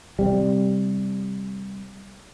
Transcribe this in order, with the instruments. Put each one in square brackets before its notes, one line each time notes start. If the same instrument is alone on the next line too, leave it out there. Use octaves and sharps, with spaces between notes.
[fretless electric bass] C3 G3